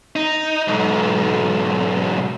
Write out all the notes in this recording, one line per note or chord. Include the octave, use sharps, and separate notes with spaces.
D#4
B1 G#2